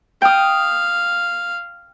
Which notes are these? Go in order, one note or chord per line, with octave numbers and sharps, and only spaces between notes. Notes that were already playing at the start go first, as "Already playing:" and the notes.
F5 G5 D#6